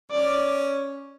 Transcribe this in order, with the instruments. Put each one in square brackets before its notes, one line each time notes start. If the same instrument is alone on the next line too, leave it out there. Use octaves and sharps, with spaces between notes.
[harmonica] C#4 [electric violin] D5